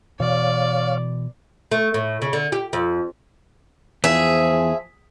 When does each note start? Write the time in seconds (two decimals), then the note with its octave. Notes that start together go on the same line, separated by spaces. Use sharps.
0.20 B2 E3 C#5 D5 F5
1.72 A3
1.94 A2
2.22 C#3
2.33 D3
2.52 G4
2.73 F2
4.04 E2 F3 G#4 E5